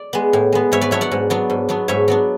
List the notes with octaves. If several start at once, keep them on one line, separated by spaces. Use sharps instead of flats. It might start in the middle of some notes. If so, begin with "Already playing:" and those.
Already playing: D5
G#3 B3
A2
G#3 B3
G#2 C#5 E5
B4 D5
F#3 B3 D4 C#5 E5
D5 F#5
G#2
F#3 B3 D4
G#2
F#3 B3 D4
G#2 C#5 E5
F#3 B3 D4